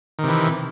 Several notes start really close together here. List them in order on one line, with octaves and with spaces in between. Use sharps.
D#3 C3 E3